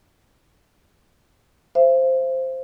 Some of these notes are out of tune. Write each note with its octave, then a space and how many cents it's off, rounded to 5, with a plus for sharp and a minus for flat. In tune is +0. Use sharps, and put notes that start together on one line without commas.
C5 +0 E5 +40